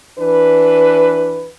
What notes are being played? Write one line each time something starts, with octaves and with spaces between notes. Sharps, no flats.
E3 D4 B4